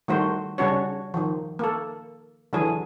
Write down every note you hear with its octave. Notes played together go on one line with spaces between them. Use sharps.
D#3 G3 A3 F#4 C5
C#3 G3 C#4 D4 F#4 C#5
D#3 F3
A#3 A4
D3 E3 F#3 G#4